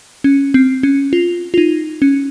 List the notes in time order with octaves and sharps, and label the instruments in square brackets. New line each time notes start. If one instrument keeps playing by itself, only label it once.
[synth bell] C#4
C4
C#4
F4
F4
D#4
C#4